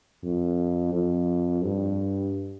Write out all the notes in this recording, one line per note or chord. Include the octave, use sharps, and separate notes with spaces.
F2
F2
G2